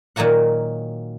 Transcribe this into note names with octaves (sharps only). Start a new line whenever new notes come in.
A#2 D#3 F#3 F#4 F#5